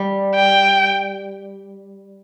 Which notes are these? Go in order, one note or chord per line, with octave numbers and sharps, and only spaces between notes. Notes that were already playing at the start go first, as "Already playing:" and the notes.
Already playing: G3
G5